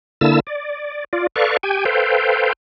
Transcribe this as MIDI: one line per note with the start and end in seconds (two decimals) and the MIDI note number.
0.21 0.40 50
0.21 0.40 58
0.21 0.40 64
0.21 0.40 81
0.21 0.40 88
0.47 1.04 74
1.13 1.27 65
1.13 1.27 74
1.36 1.57 69
1.36 1.57 71
1.36 1.57 74
1.36 1.57 77
1.36 1.57 85
1.63 1.85 67
1.63 1.85 79
1.63 1.85 80
1.85 2.53 69
1.85 2.53 71
1.85 2.53 72
1.85 2.53 77
1.85 2.53 79